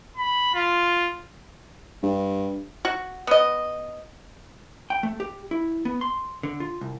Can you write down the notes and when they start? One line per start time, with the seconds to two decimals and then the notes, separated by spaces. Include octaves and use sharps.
0.17 B5
0.55 F4
2.03 G2
2.85 F#4
3.27 B3 D#5
4.90 G5
5.03 A3
5.20 G4
5.51 E4
5.85 B3
6.01 C6
6.43 D3
6.60 F4
6.81 C2